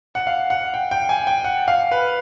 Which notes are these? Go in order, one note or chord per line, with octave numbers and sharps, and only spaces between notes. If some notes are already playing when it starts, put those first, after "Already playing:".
F#5
F5
F#5
G5
G5
G#5
G5
F#5
F5
B4